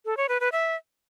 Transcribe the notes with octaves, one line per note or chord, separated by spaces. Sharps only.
A4
C#5
B4
B4
E5